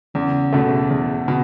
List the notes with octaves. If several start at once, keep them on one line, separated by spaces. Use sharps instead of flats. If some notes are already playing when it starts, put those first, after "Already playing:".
E2 C#3
B2 A3
E2
B2